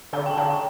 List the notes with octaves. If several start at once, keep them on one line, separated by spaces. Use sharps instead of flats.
D3 A#5
G5
A5
D3
G5